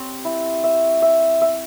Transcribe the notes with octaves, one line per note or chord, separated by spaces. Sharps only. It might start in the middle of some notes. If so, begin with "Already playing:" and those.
Already playing: C4 G4 C#5
E4
E5
E5
E5